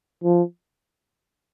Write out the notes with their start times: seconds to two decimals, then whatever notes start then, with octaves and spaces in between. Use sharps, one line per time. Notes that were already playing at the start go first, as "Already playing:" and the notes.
0.24 F3